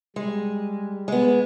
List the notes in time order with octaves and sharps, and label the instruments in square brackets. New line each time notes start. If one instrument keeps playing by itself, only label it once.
[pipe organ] G3 [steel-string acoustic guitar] G#3
[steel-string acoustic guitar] G#3 B3